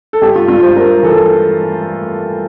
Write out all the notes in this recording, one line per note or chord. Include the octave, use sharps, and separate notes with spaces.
A4
G2 G4
F4
G2 F4
C5
G2 A#4
E3 A4